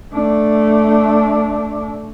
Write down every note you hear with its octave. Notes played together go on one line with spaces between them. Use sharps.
A3 D4